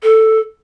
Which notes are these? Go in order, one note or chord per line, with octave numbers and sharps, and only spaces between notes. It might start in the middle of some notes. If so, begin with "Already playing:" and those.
A4